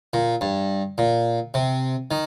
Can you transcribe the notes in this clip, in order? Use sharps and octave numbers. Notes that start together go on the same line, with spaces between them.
A#2
G2
A#2
C3
D#3